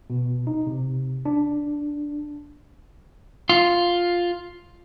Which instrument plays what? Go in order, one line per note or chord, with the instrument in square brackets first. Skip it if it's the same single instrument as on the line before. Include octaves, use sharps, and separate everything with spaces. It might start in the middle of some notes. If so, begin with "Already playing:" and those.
[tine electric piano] B2
D#4
C3
D4
[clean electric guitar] F4